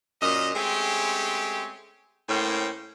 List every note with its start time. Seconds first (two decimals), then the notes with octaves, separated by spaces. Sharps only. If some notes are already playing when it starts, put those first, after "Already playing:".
0.22 F#2 A#2 D#5
0.55 G#3 A3 C4 C#4 G4
2.29 A2 A#3 C#4 C5 G5